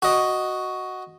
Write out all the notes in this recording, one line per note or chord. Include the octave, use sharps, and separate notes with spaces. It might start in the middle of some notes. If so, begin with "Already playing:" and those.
F#4 D#5